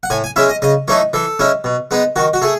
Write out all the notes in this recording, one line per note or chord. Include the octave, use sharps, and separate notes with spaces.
F#5
A2 G#5
G#5
G#3 C#4 E4 E5
D#5
C#3 D#5
E3 A3 D#4 C#5
E3 A4
G#3 C#4 E4
B2
G#3 B3 D#4
D#3 F#4
F#4
A3 G#4